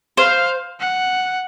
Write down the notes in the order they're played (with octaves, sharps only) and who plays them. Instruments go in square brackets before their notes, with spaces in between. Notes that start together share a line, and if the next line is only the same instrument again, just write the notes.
[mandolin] C5 [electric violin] F5
[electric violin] F#5